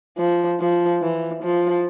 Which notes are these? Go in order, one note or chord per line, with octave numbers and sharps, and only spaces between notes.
F3
F3
E3
F3